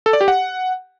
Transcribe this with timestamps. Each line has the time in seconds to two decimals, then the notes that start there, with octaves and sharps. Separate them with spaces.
0.06 A4
0.13 D5
0.21 G4
0.28 F#5